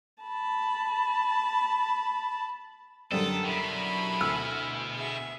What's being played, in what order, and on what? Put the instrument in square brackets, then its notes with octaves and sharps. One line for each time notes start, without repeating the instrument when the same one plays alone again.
[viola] A5 B5
[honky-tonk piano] F#2 D3 G3 [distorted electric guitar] A4 [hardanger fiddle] G5 D#6
[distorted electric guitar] B2 [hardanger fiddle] E4 B5
[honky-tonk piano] D2 E6 F6
[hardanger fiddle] G#4 E5